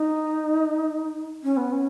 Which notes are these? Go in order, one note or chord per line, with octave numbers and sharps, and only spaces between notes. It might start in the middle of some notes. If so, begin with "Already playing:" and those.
Already playing: D#4
C#4
B3
C#4